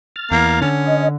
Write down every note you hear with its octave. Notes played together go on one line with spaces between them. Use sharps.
F6 A6
E2 A#3
D3 C#4
D#5